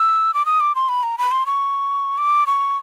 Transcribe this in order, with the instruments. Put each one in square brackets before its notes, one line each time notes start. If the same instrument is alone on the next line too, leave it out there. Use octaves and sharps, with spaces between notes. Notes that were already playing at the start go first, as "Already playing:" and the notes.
Already playing: [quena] E6
D6
D#6
D6
C6
B5
A#5
B5
C6
C#6
D6
C#6